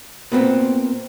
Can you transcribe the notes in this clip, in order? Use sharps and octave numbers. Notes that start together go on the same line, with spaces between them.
A#2 B3 C4